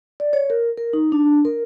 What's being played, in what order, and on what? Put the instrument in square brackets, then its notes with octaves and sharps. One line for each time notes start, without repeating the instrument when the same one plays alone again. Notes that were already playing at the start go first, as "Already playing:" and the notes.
[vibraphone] D5
C#5
A#4
A#4
D#4
D4
A#4